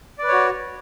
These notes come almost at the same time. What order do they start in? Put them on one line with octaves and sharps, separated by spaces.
D5 B4 C#5 F#4